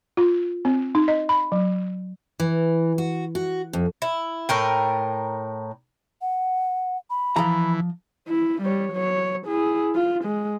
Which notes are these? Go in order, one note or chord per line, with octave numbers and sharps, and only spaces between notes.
F4
C4
D#4
D#5
B5
F#3
E3
F#4
F#4
F2
E4
A2 A#4 G5
F#5
B5
E3 F3 A#5
E4
G3 C#5
F#3 C#5
E4 G#4
F4
G#3